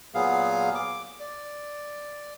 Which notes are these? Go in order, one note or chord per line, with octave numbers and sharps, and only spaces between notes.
A#2 F#3 B3 G#4 F5
D6
D5